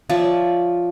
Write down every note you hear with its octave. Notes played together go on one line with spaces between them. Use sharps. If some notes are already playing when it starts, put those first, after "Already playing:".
F3 C#5 D5 E5